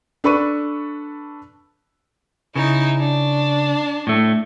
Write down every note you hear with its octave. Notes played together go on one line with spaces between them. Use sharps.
D4 A4 B4 B5 C#6 D#7
C#3 D#4 E4
D4
A2 A3